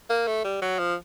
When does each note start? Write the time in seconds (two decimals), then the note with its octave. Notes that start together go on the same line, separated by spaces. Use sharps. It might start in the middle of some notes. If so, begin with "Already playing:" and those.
0.10 A#3
0.27 A3
0.44 G3
0.62 F#3
0.79 F3